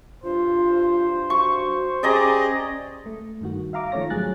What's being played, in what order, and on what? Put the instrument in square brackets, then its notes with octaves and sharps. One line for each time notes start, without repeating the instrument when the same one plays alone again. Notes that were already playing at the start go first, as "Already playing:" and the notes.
[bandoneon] G2 [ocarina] F4 [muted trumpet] C5
[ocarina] F#4 [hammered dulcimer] C#6
[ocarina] C#4 [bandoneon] G4 G#4 [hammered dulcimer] D5 D#5 A#5
[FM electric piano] A3
G2 D#3 F#4
E5 F5 A#5 D6
D#3 F3 A3 C#4 C#5 A#6
G#1 F#3 G3 G#4 F#6 A6